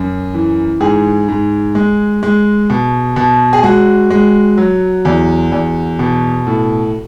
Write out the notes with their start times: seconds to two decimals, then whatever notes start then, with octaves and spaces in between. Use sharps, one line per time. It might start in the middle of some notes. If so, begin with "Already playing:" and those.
Already playing: F#2
0.34 E3
0.80 G#2 G#4
1.28 G#2
1.75 G#3
2.23 G#3
2.70 B2
3.16 B2
3.53 G#4
3.63 G#3 F#4
4.10 G#3
4.58 F#3
5.05 E2
5.52 E2
5.99 B2
6.47 A2